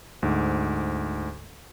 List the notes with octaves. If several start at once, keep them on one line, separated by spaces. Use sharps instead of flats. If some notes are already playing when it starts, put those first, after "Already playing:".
D2 G#2